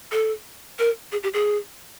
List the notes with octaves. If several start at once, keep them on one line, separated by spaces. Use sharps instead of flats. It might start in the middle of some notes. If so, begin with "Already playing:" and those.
A4
A#4
G#4
G4
G#4